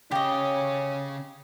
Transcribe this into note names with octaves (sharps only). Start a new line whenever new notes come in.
C#3 C#4 G4 C#5 D#5